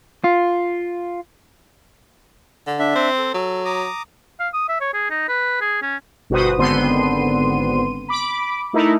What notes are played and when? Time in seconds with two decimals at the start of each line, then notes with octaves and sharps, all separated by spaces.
0.24 F4
2.67 D3
2.79 D4 E5
2.95 C4
3.18 A4
3.34 F#3
3.65 A#5 D6 D#6
4.39 F5
4.53 D#6
4.69 E5
4.81 C#5
4.93 G#4
5.10 D#4
5.28 B4
5.61 G#4
5.82 C#4
6.30 G1 B2 F#4 B4 C5 D#6
6.58 G#1 D3 B3 C4 C6 D#7
8.09 B5 D6
8.73 A3 D#4 E4 A#4